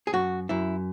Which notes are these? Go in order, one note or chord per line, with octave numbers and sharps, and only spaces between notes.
G#4
F#2 F#4
F#2 E4